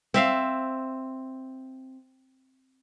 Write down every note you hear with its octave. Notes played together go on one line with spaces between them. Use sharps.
C4 E5 F5